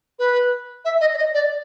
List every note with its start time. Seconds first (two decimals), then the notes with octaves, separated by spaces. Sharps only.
0.19 B4
0.85 E5
1.01 D#5
1.14 D5
1.17 D#5
1.34 D5